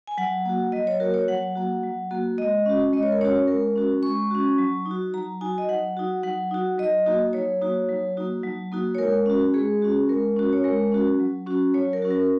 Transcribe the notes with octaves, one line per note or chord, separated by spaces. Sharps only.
G#5
F#3 F#5
A#3 F#4
F#3 D#5
C#5
A#3 F#4 A#4
C#5
F#3 F#5
A#3 F#4
F#3
A#3 F#4
G#3 D#5
C#4 F#4
G#3 D#5
C#5
A#4
C#4 F#4 C#5
G#3 A#4
C#4 F#4
G#3 C#6
C#4 F#4
F#3
D#4
F#4
F#3 A#5
D#4 F#4 G#5
D#5
F#3 F#5
D#4 F#4
F#3 F#5
D#4 F#4
F#3 D#5
A#3 D#4 F#4
F#3 C#5
A#3 D#4 F#4
F#3
A#3 D#4 F#4
F#3
A#3 D#4 F#4
C#5
G#3 A#4
C#4 F#4
G#3 G#4
C#4 F#4
G#3 A#4
C#4 F#4
C#5
G#3 A#4
C#4 F#4
F#3
C#4 F#4
F#3 C#5
A#4
C#4 F#4
A#4